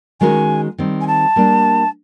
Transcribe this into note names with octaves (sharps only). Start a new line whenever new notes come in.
D#3 G#3 C#4 F#4 A#4 G#5
D#3 G3 C4
G#5
A5
G3 A#3 D4